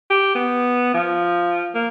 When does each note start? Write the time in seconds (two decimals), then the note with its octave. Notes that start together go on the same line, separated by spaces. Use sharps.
0.10 G4
0.35 B3
0.94 F3
1.75 A#3